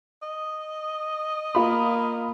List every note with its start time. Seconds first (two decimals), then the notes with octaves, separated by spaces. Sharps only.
0.22 D#5
1.55 A#3 F4 B5